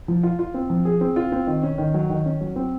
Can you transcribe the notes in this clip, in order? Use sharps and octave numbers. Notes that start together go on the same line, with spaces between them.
F3
F4
F4
C4
F3
G#4
C4
F4
C4
D#3
C#4
D#3
F#3
D#3
C#4
F#3
C4